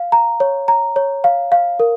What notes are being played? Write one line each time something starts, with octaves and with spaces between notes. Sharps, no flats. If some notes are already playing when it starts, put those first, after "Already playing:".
Already playing: F5
A#5
C#5
A#5
C#5
F5
F5
A#4